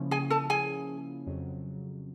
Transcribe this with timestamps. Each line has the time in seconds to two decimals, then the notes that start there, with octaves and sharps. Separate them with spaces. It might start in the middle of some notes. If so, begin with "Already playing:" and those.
Already playing: C#3 F3 A#3 C#4 E4
0.11 G#4 G#5
0.30 A4 A5
0.50 G#4 G#5
1.26 F2 C#3 F#3